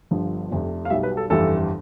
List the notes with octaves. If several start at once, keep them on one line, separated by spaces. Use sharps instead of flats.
G1 G2 F3
F1 F2 C3
F5
B1 B2 G3 E5
B4
A4
G1 F2 E3 G3 A4